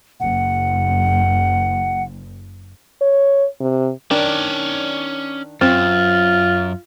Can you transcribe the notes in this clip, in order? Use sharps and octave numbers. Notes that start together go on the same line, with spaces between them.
F#1 F#5
C#5
C3
D#3 C#4 D4 D5
F#2 C4 F4